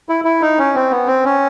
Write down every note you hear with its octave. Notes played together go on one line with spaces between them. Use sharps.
E4
E4
D#4
C#4
C4
B3
C4
C#4